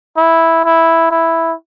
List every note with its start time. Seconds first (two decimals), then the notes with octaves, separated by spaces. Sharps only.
0.17 E4
0.65 E4
1.11 E4